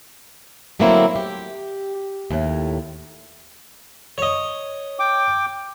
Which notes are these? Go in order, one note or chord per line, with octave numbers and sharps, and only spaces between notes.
D3 F#3 A3 A#3 C4 E4
G4
D#2 A2
C#5 D#5
G5 D6